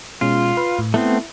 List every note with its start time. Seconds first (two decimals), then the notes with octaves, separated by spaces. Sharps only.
0.21 B2 G#3 C#4 F4
0.57 B4 F5
0.79 A2
0.94 A3 B3 C4 E4